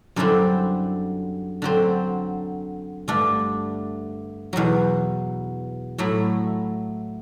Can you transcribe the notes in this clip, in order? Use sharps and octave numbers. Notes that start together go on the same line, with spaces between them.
F#2 D3 G3 C4 E4
D3 F#3 C4
G2 D3 A3 D4
E2 B2 F#3
A2 F#3 A3 E4